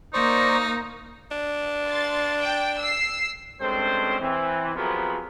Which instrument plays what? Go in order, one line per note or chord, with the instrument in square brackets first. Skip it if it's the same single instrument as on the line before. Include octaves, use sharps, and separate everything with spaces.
[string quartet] A#3 [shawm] D#4 [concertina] C5 D5 C#6
[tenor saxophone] D4
[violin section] C6 A6
G5
E6 C7
[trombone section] G2 G#3 C4 C#4 A4 C5
E3 C4
C3 F3 F#3 B3 G#4 A#4